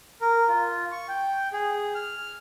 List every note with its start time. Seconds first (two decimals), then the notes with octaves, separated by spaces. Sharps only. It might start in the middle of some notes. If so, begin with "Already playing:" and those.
0.21 A#4
0.48 F4
0.92 C#6
1.09 G5
1.53 G#4
1.95 F6